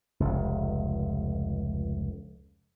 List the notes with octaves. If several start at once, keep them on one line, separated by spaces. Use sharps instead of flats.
F1 C#2